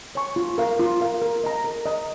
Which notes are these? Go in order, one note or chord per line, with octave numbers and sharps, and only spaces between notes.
C#5 G#5 C#6
F4
A#4 F5
F4
A#4 F5
A#4
D#5 A#5
A#4
D#5 A#5